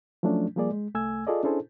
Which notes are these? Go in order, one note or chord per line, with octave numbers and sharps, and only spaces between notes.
F3 F#3 A3 C#4 D4
F3 G3 A#3 G#4 D5
G#3
C2 A3 G#5 E6 G#6
F4 G#4 A4 D5 D#5
C#4 D4 E4 G#4 A4 C5